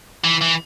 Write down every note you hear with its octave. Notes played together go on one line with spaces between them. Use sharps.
E3
E3